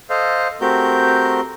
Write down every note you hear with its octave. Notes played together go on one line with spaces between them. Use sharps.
A4 C5 D#5 F5
A3 C4 F#4 G4 A#4 G6